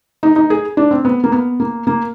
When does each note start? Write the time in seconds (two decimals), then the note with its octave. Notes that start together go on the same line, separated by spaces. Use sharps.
0.23 D#4
0.36 D#4
0.50 G#4
0.77 D4
0.91 C4
1.05 B3
1.24 A#3
1.32 B3
1.60 A#3
1.87 A#3